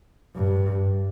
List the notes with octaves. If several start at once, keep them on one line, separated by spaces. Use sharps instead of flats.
G2